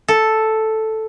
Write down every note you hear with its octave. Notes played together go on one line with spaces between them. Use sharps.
A4